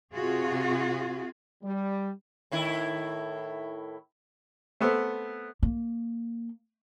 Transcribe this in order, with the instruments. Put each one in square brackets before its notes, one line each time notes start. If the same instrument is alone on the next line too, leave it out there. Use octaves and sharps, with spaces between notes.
[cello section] C3 F4 F#4 G#4
[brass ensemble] G3
[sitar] A2 D#3 E4
[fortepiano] A3 B3 C4 A4
[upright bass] A#3